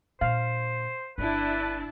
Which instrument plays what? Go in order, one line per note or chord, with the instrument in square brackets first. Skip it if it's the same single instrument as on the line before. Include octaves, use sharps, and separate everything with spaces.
[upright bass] A#2 D3 [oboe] C5 [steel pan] F5
[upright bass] G1 [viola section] D4 E4 A5 [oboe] B4